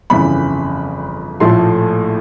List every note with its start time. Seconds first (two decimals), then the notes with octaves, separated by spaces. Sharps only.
0.10 G1 F2 C#3 E3 B5
1.40 A#1 A2 F3 A3 C6